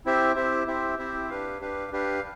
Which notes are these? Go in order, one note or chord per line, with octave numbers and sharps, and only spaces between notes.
C4 E4 G4 C5 E5
C4 E4 G4 C5 E5
C4 E4 G4 C5 E5
C4 E4 G4 C5 E5
D4 G4 B4 F5
D4 G4 B4 F5
D4 G4 B4 F5